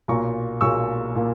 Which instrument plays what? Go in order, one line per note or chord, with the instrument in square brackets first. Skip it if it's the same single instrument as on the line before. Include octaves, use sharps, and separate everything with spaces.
[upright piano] B1 A#2 A#3 A#5 C#6
B1 A#2 A#3 C#6 E6
A#2 A#3